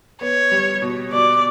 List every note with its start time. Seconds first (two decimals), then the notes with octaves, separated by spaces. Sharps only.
0.21 B3 C#5
0.51 G3
0.82 B2
1.13 B2 D5